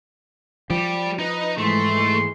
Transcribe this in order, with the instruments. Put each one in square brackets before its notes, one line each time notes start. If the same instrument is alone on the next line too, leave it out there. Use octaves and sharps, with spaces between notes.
[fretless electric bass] F3 [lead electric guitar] G3 G4
[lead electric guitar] D#4 [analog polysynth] B4 D#5
[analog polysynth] G#2 E3 G#3 [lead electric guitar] A3 [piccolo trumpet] C6